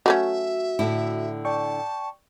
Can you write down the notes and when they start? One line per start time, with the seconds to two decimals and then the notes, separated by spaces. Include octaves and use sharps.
0.06 F#3 A3 C#4 F#4 E5
0.79 A2 D3 E4
1.45 D5 G5 A5 C#6